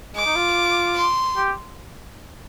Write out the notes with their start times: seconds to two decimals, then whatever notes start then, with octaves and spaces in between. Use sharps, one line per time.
0.15 G#3 D6
0.26 D#4
0.35 F4
0.96 C6
1.37 G4